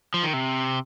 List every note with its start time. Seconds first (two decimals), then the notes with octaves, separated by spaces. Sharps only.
0.14 F3
0.23 D#3
0.33 C3